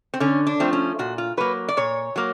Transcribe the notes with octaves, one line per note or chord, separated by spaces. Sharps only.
C4
D3 C#4
D4
F3 A3 C4
C#4
A#2 F#4
F4
F#3 A#3 B4
D5
A#2 C#5
F#3 A#3